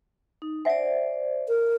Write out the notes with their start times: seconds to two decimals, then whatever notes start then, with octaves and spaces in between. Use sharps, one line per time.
0.42 D#4
0.65 C5 D5 E5 F#5 G#5
1.48 A#4